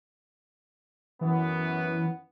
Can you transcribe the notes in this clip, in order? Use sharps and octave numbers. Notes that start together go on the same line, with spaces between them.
F#2 E3 B3